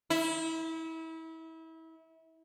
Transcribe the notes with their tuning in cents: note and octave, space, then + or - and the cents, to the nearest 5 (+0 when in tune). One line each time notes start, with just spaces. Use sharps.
E4 -30